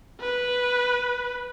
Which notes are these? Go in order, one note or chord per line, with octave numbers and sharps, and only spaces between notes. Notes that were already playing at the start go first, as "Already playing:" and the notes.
B4